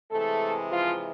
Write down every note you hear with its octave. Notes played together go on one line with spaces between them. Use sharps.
C3 E3 G#3 A3 A4
F3 F4